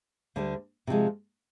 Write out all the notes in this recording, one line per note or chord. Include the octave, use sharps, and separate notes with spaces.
D2 D3 G3
C3 F3 G#3